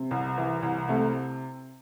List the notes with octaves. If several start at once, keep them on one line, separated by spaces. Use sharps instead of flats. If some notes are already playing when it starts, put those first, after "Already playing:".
Already playing: C3
C2
E3
C2
C3 A3